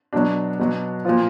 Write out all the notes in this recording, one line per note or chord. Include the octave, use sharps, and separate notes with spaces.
B2 F#3 D4
B2 F#3
A#2 F3 F4